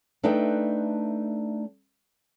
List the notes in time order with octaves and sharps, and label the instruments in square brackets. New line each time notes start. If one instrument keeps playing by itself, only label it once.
[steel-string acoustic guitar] A3 D4 D#4 B4 E5 G5